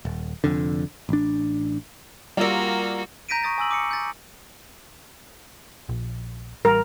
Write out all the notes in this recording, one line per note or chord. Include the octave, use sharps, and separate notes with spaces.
D#1
F1 F2 D3
A1 D4
G3 A#3 F4 F#4 A#4 D5 E6
A#5 G6 A#6 B6 D7 D#7
C#6 D#6 A6
G#5 D#6 E6 F#7
D6 C#7
G6 A6
A#1
A1 G3 A#4